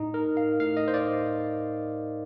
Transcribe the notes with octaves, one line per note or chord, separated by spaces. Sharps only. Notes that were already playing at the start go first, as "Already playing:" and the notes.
Already playing: A2 D#4
A#4
F5
A2 F5
D#5
C5
D5